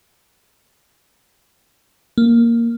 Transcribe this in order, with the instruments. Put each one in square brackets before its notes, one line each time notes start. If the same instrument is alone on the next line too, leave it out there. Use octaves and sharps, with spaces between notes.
[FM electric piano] A#3